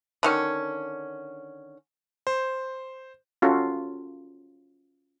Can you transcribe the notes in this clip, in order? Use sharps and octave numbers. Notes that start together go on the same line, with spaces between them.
D3 D#3 C#4
C5
C#4 F4 F#4 A4